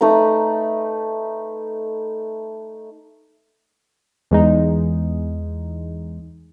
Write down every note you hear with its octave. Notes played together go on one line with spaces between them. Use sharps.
A3 D#4 B4 A#5
E2 G#3 D#4